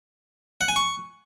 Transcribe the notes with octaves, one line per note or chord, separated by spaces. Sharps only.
F#5
G#5
C#6